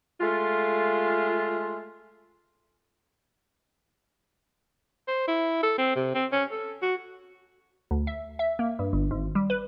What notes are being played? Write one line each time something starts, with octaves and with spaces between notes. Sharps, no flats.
G#3 A3 F4
C5
E4
A4
C4
C3
C4
C#4
A4
F#4
D2
E5
E5
A#3
G2
G1
G#1
G3
B4